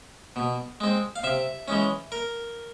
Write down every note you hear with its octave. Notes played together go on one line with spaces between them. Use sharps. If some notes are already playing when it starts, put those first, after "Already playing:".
B2
G#3 C4
F5
C3 E5
E3 G#3 C#4
A#4